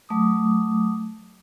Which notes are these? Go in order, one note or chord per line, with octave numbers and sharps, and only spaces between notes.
F#3 A3 D6 D#6